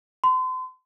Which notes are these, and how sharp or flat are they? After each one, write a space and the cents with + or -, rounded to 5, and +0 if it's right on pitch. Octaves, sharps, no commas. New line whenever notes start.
C6 -40